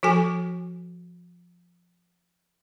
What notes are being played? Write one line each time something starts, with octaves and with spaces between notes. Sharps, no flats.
F3 F#4 A4 G#5